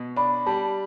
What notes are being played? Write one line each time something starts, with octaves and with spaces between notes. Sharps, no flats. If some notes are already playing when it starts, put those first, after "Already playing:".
Already playing: B2
D4 B5
G3 A5